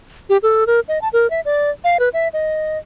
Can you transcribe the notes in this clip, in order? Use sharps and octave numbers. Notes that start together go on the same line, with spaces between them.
G4
A4
A#4
D#5
A5
A#4
E5
D5
F5
B4
E5
D#5